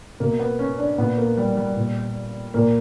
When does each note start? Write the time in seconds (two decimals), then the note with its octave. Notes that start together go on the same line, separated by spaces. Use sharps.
0.20 B2 A#3
0.39 B3
0.59 C#4
0.79 D4
0.98 A#2 B3
1.18 A#3
1.37 G3
1.57 G3
1.76 A#2
2.54 A#2 A#3